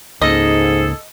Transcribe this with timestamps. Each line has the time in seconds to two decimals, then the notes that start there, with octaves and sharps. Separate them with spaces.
0.22 C#2 G#2 C#3 A#3 G#4 A4 D#5